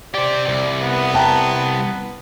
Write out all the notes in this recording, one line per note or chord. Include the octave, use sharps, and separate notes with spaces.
G4 C5 D5
C2
B3
G5 A5 A#5